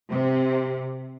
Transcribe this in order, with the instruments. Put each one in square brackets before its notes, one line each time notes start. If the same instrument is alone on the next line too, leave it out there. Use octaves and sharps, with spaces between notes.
[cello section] C3